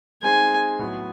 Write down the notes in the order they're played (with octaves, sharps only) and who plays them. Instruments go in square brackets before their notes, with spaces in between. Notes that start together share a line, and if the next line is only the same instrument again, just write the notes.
[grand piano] G#3 C4 D#4 G#4 C5 [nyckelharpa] G#5
[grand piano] A2 F#3 B3